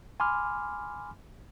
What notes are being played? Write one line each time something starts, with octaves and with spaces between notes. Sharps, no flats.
G#5 B5 C6 D6 F6